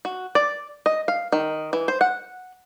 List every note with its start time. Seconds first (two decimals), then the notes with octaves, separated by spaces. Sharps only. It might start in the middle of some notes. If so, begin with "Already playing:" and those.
0.05 F#4
0.35 D5
0.86 D#5
1.08 F5
1.33 D#3
1.73 E3
1.88 C5
2.01 F#5